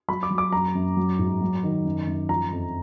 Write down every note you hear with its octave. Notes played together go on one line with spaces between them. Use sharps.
F#3 B5
D6
F#3
D6
F#2 A#5
F#2
F#3
G#2
F#3
D#3
F#2
F#2
F3 A#5
F2